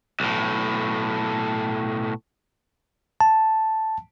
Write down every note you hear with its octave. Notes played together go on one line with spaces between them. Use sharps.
B1 A2
A5